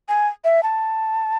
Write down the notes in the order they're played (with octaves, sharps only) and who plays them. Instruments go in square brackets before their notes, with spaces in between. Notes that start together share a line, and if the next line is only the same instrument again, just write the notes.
[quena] G#5
E5
A5